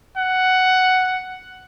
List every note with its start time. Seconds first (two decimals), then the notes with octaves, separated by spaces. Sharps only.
0.17 F#5